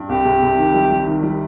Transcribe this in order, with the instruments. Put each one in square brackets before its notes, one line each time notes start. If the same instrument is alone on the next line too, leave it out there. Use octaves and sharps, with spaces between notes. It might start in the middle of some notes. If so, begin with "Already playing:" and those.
Already playing: [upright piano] G2
[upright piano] C2 [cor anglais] G4
[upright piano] C3
C3
D#3
G3
G3
D#3
G3